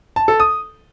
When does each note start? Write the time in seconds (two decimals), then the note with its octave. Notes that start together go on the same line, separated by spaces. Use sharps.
0.16 A5
0.28 A4
0.40 D#6